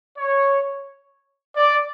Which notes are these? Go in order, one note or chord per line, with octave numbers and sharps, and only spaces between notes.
C#5
D5